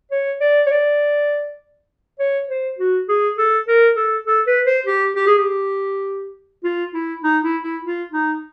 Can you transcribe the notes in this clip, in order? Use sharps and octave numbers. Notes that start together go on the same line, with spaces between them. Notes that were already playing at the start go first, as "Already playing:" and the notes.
C#5
D5
C#5
D5
C#5
C5
F#4
G#4
A4
A#4
A4
A4
B4
C5
G4
G4
G#4
G4
F4
E4
D#4
E4
E4
F4
D#4